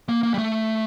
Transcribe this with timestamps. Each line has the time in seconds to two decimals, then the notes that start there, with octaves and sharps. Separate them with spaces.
0.09 A#3
0.23 A#3
0.34 G3
0.38 A3